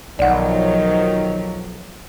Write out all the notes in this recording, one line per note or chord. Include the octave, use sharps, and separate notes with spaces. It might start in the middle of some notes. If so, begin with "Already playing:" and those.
B1 D#3 F3 F#3 D5 F#5